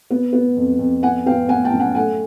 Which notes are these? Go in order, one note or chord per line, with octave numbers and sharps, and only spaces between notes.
B3
B3
F2
F2
B3 F#5 G#5
B3 F5 G5
B3 F#5 G#5
G5 A5
F#2
F#5 G#5
A3 F#5 G#5